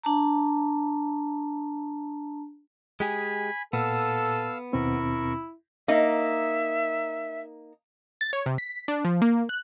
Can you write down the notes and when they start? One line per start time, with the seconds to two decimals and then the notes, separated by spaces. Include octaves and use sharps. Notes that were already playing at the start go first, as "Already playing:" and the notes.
0.04 D4 A5 A#5
3.00 G#3 G4 G#4 G#5 B5
3.73 A#2 B3 A4 F5 E6
4.73 D#2 B2 C4 E4 A#4 C#6
5.88 A#3 D#4 E5
8.21 A6
8.33 C#5
8.46 C3
8.58 B6
8.88 D4
9.05 F3
9.22 A#3
9.49 F#6